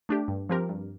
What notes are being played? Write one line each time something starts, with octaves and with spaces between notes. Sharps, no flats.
A3 D4 G4
G2
F3 C4 G4 A#4
G2